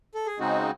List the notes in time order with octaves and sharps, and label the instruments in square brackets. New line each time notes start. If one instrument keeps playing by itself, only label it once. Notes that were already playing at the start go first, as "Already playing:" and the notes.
[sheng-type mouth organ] A4
G#4
[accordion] C#3 G#3 C4 D#4 [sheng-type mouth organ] F#4